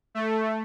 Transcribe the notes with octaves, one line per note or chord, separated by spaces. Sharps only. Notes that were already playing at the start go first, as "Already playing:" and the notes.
A3